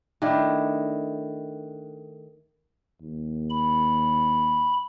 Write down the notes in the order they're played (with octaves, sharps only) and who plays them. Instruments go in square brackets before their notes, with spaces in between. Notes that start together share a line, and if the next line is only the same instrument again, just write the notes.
[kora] D#3 A3 D4 E4
[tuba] D#2
[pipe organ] B5